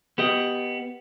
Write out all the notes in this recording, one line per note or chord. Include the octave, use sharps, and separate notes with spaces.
B3 G4 D#5